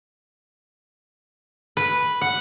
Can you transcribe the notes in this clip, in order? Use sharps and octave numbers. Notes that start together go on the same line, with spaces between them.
B4
F#5